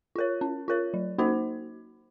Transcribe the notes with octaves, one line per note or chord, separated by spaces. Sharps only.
F4 A#4 C#5
C#4
F4 A#4 C#5
F#3
A#3 D#4 F#4 C5